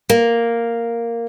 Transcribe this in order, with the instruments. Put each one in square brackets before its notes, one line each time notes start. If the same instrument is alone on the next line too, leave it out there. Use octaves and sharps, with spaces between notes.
[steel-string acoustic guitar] A#3